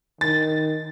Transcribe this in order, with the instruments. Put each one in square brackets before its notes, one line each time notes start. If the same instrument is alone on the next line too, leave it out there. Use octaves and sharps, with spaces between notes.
[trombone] D#3 [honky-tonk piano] A6